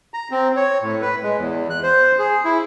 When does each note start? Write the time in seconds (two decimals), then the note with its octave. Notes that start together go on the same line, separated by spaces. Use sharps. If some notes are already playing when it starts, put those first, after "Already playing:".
0.14 A#5
0.31 C4
0.56 C#5
0.82 A2
1.02 B4
1.23 G#3
1.38 E2
1.70 F#6
1.83 C5
2.18 G#4
2.44 E4